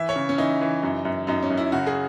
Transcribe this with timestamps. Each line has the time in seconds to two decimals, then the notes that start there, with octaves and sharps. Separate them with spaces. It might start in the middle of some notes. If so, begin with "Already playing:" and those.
Already playing: E3 E5
0.09 C#5
0.16 C#3
0.29 C#4
0.38 E3 D#4
0.61 E3
0.83 F#2
1.05 F#2
1.27 F#2 D#4
1.43 C#4
1.50 F#2
1.57 E4
1.72 C#3 F#4
1.87 G#4